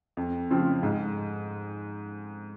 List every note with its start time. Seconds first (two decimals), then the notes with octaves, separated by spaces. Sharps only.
0.17 F2
0.50 C#3 F3 C4
0.83 G#2